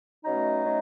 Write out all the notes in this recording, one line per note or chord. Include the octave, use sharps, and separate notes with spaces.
B2 F#3 A3 C#4 D#4 D#5
B2 F#3 A3 C#4